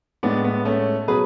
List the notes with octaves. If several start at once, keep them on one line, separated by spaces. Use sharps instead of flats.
A2 G#3 B3 D4
B3
A3 C#4
B2 F#3 G#4 B4